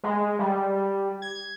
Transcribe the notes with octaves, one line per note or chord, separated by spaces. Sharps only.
G#3
G3
G#6